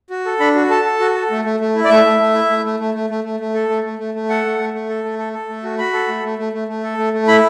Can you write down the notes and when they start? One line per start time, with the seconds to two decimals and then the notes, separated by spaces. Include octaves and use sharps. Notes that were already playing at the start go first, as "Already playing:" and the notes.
0.10 F#4
0.26 A4
0.40 D4 B5
0.55 F#4
0.70 A4 A5
0.85 A4
1.00 F#4
1.15 A4
1.31 A3
1.45 A3
1.60 A3
1.75 E4
1.84 D5
1.90 A3 E5
2.05 A3
2.20 A3
2.34 E4
2.50 A3
2.65 A3
2.80 A3
2.95 A3
3.10 A3
3.24 A3
3.40 A3
3.54 A4
3.69 A3
3.84 A3
3.99 A3
4.14 A3
4.29 A4 F#5
4.44 A3
4.58 A3
4.74 A3
4.89 A4
5.04 A3
5.19 A4
5.33 A4
5.49 A3
5.63 F#4
5.78 F#4 B5
5.93 A4
6.08 A3
6.23 A3
6.39 A3
6.53 A3
6.68 A3
6.83 A4
6.98 A3
7.13 A3
7.27 E4 B5